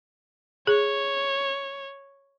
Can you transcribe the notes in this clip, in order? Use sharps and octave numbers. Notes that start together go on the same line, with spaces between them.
G#4 C#5